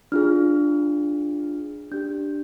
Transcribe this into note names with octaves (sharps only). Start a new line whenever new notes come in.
D4 F4 G#4 F6
D4 G4 G6